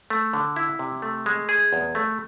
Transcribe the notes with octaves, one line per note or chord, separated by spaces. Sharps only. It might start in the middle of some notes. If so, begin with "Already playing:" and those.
A3
D3
E4
C3
A3
G#3
G#4
E2
A3